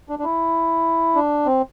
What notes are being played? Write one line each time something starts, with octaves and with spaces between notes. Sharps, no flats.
D4
D4
E4
D4
C4